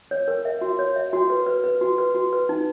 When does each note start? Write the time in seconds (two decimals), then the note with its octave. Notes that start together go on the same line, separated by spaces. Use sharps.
0.11 C#5
0.28 A#4
0.45 E5
0.61 F#4
0.79 C#5
0.96 E5
1.13 F#4
1.30 B4
1.46 B4
1.64 B4
1.81 F#4
1.98 B4
2.15 F#4
2.33 B4
2.49 D#4